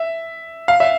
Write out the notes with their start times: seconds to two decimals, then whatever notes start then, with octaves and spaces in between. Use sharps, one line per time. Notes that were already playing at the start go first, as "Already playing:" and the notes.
Already playing: E5
0.68 F5
0.80 E5